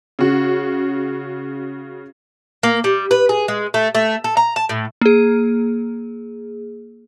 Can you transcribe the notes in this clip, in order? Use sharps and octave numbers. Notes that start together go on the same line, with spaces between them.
C#3 F#4
A#3
G3
B4
G#4
G#3
A3
A3
A4
A#5
A5
A2
A#3 G#4